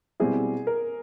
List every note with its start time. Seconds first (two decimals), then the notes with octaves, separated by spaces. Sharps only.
0.20 B2 G3 C4 E4 G#4
0.67 A#4